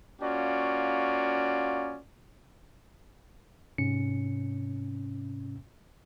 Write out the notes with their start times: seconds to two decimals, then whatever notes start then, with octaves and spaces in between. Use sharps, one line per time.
0.21 A#3 C#4 F4 F#4 D5
3.78 G#2 C3 C#4 C#7